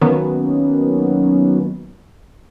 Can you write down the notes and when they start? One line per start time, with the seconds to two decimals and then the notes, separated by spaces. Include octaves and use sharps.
0.02 D#3 F#3 A#3 B3 C#4